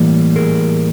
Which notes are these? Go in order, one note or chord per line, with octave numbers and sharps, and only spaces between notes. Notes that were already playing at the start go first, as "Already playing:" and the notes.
Already playing: A2 E3 G3 A#3
G#4 A#4